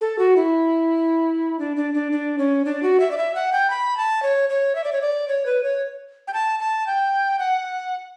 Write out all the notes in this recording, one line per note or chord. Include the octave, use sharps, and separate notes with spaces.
A4
F#4
E4
D4
D4
D4
D4
C#4
D4
F#4
E5
D5
E5
F#5
G5
B5
A5
C#5
C#5
E5
D5
C#5
D5
C#5
B4
C#5
G5
A5
A5
G5
F#5